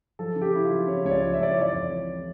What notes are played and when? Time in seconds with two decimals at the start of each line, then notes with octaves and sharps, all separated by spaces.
0.19 F3 A4
0.35 C#3
0.41 G4
0.54 C#3 E4
0.65 F4
0.70 F3
0.87 C#3 C#5
1.05 C#2 C#5
1.11 D5
1.22 F3
1.34 E5
1.39 C#2 D5
1.52 C#5
1.56 E3
1.61 D5
1.73 F2
1.90 E3